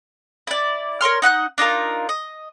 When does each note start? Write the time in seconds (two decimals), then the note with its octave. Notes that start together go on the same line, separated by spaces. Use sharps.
0.47 E4 D5
1.01 A#4 C#5 C6 F6
1.22 D#4 F#5 B5 F#6
1.58 D4 D#4 F4 A#4
2.09 D#5